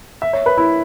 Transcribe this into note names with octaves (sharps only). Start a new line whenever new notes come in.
E5
C#5
B4
E4